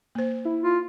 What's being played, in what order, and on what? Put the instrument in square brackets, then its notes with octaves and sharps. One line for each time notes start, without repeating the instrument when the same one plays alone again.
[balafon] A#3 C5
[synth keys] E4
[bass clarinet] F4